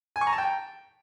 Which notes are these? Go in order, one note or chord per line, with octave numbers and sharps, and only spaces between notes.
G#5
C#6
A#5
A5
G5